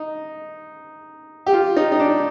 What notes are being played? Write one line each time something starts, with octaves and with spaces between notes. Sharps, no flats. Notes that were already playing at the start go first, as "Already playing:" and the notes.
Already playing: D#4
G4
F4
D#4
D#4
D4